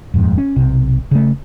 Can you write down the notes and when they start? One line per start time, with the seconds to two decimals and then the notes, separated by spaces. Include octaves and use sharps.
0.14 D#1 F2 G#2
0.38 C#4
0.56 B1 C3
1.11 C#3 A3